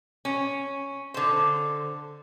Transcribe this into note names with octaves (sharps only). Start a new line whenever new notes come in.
C#4
D3 C5